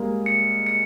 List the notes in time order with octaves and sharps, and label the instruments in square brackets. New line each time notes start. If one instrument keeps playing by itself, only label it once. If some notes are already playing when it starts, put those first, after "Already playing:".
Already playing: [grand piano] G3 G#3 A#3
[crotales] C#7
C#7